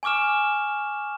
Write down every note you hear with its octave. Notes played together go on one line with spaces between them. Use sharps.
G#5 C#6 D6 F6 E7